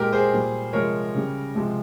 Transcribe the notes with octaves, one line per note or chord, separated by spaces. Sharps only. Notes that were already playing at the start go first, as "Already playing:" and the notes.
Already playing: A#2 G#3 G4 A#4
G#4 C5
A#2 G3
C3 F3 G#3 A#4 C#5
C#3 G3
C3 F3 G#3